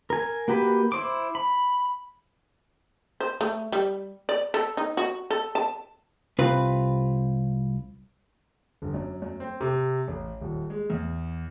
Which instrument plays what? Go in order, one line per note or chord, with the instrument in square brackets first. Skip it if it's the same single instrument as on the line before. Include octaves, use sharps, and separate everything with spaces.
[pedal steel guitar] A#4 G#5
A#3 F#4 G4 B4
E4 C5 D6
B5
[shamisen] C5
A3
G3
D5
A4
D#4
F#4
A4
A5
[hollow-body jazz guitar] C2 C4 F4 B4
[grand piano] G1
F#2
F#2
C4
C3
A1
D#1
G#3
E2